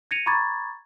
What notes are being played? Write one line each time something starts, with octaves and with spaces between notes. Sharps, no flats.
G#6 A#6 C#7 D#7 F7
A#5 B5 C#6 D6 G#6 A6